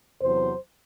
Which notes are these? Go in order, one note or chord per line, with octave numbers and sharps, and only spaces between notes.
E2 C3 F#3 C5